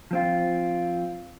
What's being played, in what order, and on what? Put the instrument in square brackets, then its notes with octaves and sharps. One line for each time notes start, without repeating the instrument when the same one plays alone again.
[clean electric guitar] F3 C4 F4